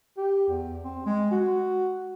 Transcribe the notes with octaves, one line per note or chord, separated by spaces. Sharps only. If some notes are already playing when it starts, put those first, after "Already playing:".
G4
E2
C4
G#3
F#4